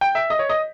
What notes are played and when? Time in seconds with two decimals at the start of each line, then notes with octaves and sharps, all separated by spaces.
0.01 G5
0.15 E5
0.30 D#5
0.39 C#5
0.49 D#5